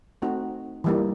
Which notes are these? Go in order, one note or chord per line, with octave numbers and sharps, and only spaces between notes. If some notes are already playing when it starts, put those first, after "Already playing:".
A3 C4 D#4 F#4
E3 G3 A#3 D#4